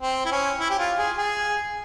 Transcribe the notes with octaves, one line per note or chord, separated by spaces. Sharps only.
C4
E4
C#4
E4
G4
F4
G#4
G#4